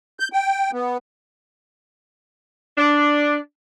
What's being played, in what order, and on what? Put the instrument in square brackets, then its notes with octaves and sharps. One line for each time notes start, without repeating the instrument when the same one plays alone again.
[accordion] G6
G5
B3
[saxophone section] D4